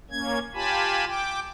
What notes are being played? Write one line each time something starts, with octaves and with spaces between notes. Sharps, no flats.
A#3 C#4 G#6
F4 G4 G#5 A5 B5
G5 D6